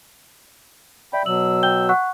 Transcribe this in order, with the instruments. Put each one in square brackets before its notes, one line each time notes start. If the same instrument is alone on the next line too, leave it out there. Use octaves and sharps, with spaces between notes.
[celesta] D5 E5 [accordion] G5 B5
[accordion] B2 F#3 E6 [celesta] F#7
[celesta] G5 G6 G7
F#5 C#6 F#6